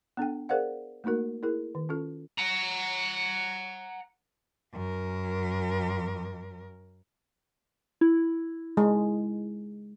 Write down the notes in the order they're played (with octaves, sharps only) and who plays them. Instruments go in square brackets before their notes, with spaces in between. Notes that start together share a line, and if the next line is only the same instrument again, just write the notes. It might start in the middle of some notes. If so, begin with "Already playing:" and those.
[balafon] B3 D4 A4 G5
G#4 A#4 C5 D5 F5 F#5
A3 A#3 D#4 F#4 A#4
E4 G#4 A#4
D#3
C#4 F4 A4
[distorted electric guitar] F#5 A#5
[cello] F#2 A#4
[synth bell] E4
[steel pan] G#3